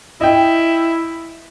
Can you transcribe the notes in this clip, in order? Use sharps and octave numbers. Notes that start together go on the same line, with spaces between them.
E4 D#5 G5